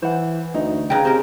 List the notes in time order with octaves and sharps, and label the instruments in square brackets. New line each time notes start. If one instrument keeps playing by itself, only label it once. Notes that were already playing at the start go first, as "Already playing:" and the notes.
[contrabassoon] E3 [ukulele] C5 F#5
[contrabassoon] D2 [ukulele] D#4
[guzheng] C#3 D#4 [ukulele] G#4 B4 G5
[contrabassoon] C3 [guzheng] C#4 A#4 [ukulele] C5